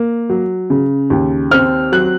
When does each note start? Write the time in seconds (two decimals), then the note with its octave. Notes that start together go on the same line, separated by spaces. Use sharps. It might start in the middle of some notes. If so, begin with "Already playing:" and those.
Already playing: A#3
0.29 F#3
0.70 C#3
1.10 D#2
1.51 C4 F6
1.92 F#3 F#6